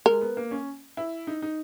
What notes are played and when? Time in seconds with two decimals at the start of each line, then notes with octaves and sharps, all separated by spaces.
0.06 G#3 A#4
0.21 B3
0.37 A#3
0.51 C#4
0.97 E4
1.27 D#4
1.42 D#4